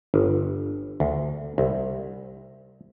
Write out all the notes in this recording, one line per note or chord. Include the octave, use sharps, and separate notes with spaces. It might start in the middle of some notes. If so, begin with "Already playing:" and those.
G1
D2
C2